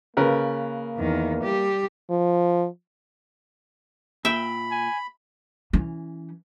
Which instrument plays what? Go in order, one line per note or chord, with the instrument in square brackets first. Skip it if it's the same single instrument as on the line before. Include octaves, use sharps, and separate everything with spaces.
[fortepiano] C#3 A#4 B4 [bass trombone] A#3
[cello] E2 D#3
G3 G4
[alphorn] F3
[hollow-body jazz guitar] A#2 [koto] E5 G5 [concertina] B5
[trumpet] G#5
[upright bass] E3 C#4